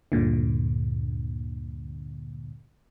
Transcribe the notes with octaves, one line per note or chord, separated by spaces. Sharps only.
D2 G2 A#2 D3